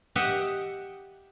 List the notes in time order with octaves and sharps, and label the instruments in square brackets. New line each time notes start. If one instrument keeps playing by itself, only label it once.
[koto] G4 D#5 E5 F#5